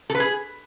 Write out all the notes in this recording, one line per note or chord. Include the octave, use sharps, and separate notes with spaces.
A4
B4
G#4